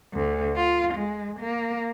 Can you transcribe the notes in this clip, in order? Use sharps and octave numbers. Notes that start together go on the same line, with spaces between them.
D2
F4
G#3
A#3